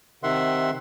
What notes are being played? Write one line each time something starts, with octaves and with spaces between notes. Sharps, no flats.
C3 D#3 E5 F#5 C6